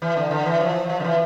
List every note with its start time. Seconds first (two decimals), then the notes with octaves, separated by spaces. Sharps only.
0.02 E3
0.17 D3
0.31 D3
0.45 E3
0.60 F3
0.90 F3
1.00 D3
1.04 E3